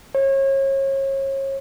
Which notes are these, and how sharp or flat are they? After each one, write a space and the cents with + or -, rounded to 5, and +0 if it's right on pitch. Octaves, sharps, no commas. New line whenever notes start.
C#5 -35